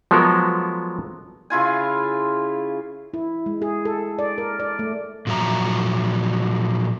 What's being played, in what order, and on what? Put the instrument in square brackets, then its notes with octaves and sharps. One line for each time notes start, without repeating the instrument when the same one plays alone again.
[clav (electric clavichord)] F3 F#3 G#3 B3 A4 A#4
[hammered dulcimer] C#3 E4 F4 G#5
[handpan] E4
G#3
G#4
A4
D5
A#4
D5
A3
[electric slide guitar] A#2 F3 F#3 E5 A#5